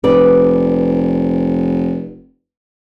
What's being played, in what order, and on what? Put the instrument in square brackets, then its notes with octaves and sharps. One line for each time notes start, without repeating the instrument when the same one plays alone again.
[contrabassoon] F1 [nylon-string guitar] B4 D5